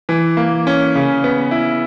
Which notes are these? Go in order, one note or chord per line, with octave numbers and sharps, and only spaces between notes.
E3
A#3
C#4
C#3
B3
E4